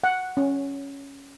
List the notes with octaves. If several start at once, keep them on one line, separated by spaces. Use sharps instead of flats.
F#5
C#4